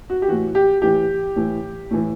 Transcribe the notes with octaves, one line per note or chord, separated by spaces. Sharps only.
F#4
G4
A2 E3 F#4
G4
A2 E3 G4
A2 E3
A2 E3